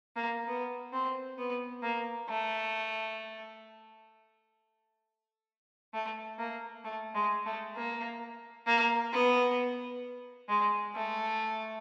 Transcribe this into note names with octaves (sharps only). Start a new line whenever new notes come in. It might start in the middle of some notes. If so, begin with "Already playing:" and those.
A#3
B3
C4
B3
A#3
A3
A3
A#3
A3
G#3
A3
A#3
A#3
B3
G#3
A3